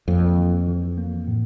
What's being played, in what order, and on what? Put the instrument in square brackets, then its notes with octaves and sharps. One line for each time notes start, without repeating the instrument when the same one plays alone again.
[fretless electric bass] F2 [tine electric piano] A#3
[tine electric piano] E3
E3
A#3
A2